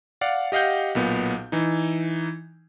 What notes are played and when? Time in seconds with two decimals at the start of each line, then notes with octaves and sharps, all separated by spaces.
0.21 D5 F5 F#5
0.52 G4 D#5 F5 F#5 G6
0.95 B1 A#2 B3
1.52 E3 D#4